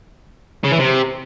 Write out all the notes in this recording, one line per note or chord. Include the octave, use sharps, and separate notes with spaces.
C#3
E3
C3